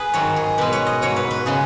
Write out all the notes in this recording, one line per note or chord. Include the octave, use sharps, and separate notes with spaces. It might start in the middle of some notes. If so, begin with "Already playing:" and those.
Already playing: G#4 B4
G#2 D#3 F#3 C#5
G#4
B2 G#3 B4
C#5
D#5
G#2 F#3 C#5
B4
B4
C#3 G#3 G#4